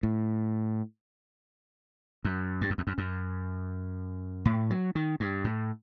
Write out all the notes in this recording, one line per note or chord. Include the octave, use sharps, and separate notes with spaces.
A2
F#2
G2
F#2
E2
F#2
F#2
A2
F#3
D#3
G2
A2